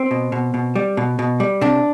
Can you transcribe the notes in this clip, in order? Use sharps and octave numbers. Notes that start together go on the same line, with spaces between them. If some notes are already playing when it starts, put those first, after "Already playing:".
Already playing: C4
B2
B2
B2
G3
B2
B2
G3
C3 D4